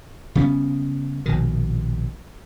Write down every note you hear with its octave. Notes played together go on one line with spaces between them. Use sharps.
C#3 G3 B3 C#4
A#1 B2 D#3